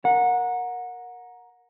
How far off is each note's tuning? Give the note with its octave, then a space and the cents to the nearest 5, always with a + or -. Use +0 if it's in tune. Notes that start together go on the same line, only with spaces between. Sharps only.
A#4 +10 F#5 -25